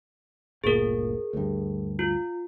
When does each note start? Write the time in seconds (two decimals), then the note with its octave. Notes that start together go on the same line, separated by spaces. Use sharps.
0.64 G1 D2 A#2 G#4 A#4
1.33 D2 G2
1.99 F4